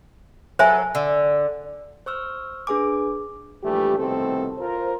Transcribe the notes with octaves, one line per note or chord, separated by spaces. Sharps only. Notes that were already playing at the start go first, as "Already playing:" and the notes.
F#3 A4 B4 C5 E5 G#5
D3
C5 C#6 E6 F6
D4 G#4 B4 G#5 D6
A#1 E3 G3 A3 G4
C2 B2 D#3 A3 C4 A4
F4 A#4 C5